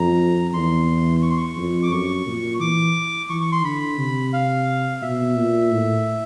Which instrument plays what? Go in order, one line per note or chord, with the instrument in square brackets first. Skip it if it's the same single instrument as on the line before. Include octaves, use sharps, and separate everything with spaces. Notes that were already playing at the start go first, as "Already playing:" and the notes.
Already playing: [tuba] F2 [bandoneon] A#5
[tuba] E2 [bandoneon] C6
[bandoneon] C#6
C6
C#6
[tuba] F2
[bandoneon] D6
[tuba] F#2 [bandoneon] C#6
[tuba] A#2
[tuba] E3 [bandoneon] D6
[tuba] E3 [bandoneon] C#6
[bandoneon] C#6
C6
[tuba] D3 [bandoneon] B5
[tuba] C3
[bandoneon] F5
[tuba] B2 [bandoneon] E5
[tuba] A#2
A2